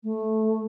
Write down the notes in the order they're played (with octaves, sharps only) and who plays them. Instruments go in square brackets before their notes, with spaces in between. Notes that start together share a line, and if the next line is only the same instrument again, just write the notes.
[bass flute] A3